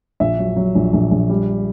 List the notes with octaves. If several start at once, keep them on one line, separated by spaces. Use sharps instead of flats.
A#1 E5
F#3
F#3
A#1
A#1
A#1
G3